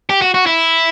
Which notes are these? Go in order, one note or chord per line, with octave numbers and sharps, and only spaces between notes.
G4
F#4
F#4
E4